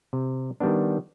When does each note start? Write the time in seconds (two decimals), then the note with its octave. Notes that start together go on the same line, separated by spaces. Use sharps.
0.13 C3
0.60 D#3 G3 B3 D4